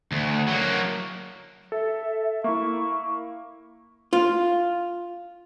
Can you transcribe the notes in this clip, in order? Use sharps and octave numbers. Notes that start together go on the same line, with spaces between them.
D2
F#3 A#3
A4 E5
A#3 E4 C#6
F4